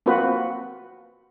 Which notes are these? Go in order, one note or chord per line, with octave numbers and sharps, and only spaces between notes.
A#3 C4 F4 F#4 B4